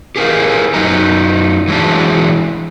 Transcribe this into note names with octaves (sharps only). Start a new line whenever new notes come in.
G4 G#4 A#4 F5
F#2 F#3 D#4 A#5
E3 F#3 G#3 D4 A5